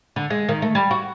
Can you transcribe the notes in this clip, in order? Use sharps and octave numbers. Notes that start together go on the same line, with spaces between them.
D3
G#3
D#3
A3
G3
F#4